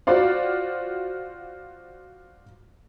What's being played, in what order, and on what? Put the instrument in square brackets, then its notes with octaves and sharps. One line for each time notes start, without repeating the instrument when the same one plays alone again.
[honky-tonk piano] F4 F#4 C5 D5 F5